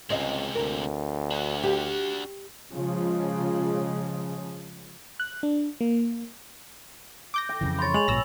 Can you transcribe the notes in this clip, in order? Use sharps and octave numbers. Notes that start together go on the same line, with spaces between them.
C#2 C3 G#3 C4 D#5
D2 A#4
D4 F#4
G4
C#3 F3 G#3
F#6
D4
A#3
D6 G6 A#6
G5
F2 C#3 E3
C#5 B5 C6 A6
G#3 G#5 F7 F#7
A#1 G#2 B2 E6 A#6